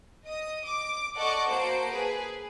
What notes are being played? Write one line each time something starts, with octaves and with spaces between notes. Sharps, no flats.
D#5 D#6
D6
A4 D5 D#5 F#5 C#6 D6
A#3 F#4 C5 A5 D7
G#4 B4